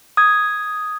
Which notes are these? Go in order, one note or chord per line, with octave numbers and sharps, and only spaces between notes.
D#6 G#6